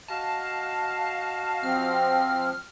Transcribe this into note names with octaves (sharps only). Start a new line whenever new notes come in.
F#4 D#5 F5 A5
F3 C4 F6